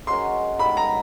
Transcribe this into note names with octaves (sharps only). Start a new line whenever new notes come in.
G#3 C#4 F#4 A#4 C6
G3 B3 D#4 B5
A#5